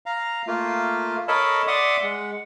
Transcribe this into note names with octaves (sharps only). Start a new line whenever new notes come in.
F5 A#5
A3 A#3 F4
A4 A#4 C#5 D#5 A5 B5
D5 E5 F#5 C6 D6 D#6
G#3 F#5